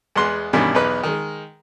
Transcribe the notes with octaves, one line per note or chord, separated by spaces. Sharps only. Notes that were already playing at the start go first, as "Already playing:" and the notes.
E2 G#3 B3 F#5 C6
G2 B2 D#3 E3 C#4
B1 E2 D#4 B4 D#5
D#3 G#3